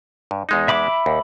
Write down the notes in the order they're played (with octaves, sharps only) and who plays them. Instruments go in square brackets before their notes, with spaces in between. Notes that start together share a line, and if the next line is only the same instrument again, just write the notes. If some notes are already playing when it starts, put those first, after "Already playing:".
[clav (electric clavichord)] G2
E2 G#3 D#4
[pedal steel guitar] E5 B5 D6
[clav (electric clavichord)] D#2